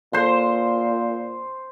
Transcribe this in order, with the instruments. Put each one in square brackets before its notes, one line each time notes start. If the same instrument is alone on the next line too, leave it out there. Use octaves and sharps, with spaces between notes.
[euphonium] A#2 [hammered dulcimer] C5 C6